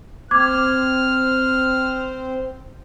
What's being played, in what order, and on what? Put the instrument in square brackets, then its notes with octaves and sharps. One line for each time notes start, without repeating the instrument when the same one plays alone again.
[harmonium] C4 C5 [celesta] D6 G#6 [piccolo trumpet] F6